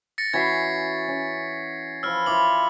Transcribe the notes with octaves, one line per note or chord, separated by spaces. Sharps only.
A6 A#6 C#7
E3 C#4 F#4 G#6 B6 C7
C#4
F3 B4 C#5 E6 F6
E3 E4 F4 D6 F#7